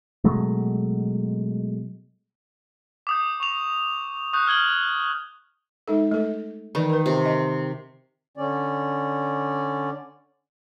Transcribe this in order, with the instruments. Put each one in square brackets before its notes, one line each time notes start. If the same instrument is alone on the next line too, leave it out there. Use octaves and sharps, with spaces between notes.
[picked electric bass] B2 F#3 G#3 A3
[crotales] D6 D#6 G6
C#6 F7
C#6 D#6 F#6 G6
D#6 F6 G#6 F#7 G7
[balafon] G#3 D#4 A4
A3 A4
[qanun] D#3 [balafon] E3 B4 D5
[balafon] A#4 B4
[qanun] C3
[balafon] D#5 G5 G#5
[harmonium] D3 C#4 D5